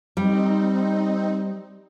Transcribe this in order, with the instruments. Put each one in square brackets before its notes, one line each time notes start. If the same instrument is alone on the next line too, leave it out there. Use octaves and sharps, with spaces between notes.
[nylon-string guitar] G3 [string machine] C4 D#4